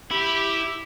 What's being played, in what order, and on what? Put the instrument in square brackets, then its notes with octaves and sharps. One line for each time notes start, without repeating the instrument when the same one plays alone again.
[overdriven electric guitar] E4 [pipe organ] G4